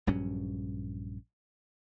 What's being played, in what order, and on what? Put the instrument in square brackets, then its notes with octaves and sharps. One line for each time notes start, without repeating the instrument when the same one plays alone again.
[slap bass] A#1 G2 F#3 C#4